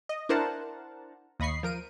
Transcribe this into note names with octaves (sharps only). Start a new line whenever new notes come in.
D#5
D4 E4 A#4 C5 F#5 A5
D#2 D#5 B5 C#6 C7
F3 A#4 D7 D#7